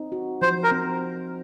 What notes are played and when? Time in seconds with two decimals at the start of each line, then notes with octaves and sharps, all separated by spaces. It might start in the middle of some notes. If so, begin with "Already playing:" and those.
Already playing: C4 D#4
0.12 F#4
0.42 F3 C5
0.64 A#4
0.71 C4